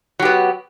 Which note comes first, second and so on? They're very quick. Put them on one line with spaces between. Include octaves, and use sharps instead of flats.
F#3 G4 B3